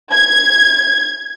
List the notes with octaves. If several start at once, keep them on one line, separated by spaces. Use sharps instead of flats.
G#6